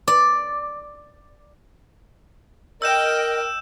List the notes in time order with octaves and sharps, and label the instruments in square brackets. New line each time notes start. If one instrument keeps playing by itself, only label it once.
[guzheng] D5
[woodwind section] A#4 [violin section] D#5 G5 [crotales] E6 G6 E7